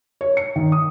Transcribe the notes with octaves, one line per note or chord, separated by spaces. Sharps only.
C#5
C#7
D#3
D#6